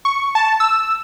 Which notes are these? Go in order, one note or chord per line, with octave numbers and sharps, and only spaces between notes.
C#6
A5
E6